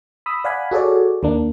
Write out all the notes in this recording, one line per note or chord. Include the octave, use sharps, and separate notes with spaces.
B5 D#6 E6
D5 F5 F#5 G#5 B5
F#4 G#4 A4 C#5 D5
D#2 A#3 D4